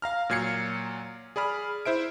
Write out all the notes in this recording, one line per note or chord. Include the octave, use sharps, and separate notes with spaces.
F5 A#5 F6
A#2 F#3 G#6 C7 C#7
G#4 D5 B5 F6
E4 C5 E5 D7